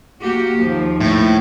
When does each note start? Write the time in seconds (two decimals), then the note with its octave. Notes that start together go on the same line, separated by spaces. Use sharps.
0.21 A#3 F#4 G4
0.59 D#2 F3
1.01 A2